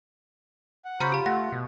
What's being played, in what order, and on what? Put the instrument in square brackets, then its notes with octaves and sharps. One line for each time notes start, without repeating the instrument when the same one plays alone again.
[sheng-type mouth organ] F#5
[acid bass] C#3 [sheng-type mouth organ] F#4 C5 B5 [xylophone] A#5 F6 C#7
[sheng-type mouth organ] F4 [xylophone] G4 B5
[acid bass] A3 [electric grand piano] F#5 [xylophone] A#6
[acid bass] B2